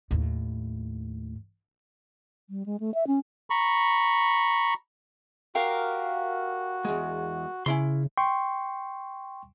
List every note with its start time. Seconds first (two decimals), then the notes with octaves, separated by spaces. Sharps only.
0.11 D#2 A2
2.50 G3
2.66 G#3
2.80 A3
2.94 E5
3.07 C#4
3.50 A#5 B5 C#6
5.55 F#4 G4 A#4 F5
6.85 E2 G#3
7.66 C#3 C#4 E4 C6
8.18 G5 C6 C#6